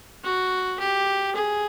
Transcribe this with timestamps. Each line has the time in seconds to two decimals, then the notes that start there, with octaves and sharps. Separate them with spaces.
0.24 F#4
0.80 G4
1.36 G#4